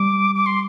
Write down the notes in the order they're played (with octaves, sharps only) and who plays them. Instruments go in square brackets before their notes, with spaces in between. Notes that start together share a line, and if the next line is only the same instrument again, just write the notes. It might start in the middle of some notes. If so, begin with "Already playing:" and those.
Already playing: [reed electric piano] G3 [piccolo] D6
[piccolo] D6
C6